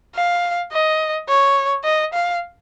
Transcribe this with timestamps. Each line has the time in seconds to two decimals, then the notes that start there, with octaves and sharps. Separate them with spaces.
0.15 F5
0.72 D#5
1.29 C#5
1.84 D#5
2.14 F5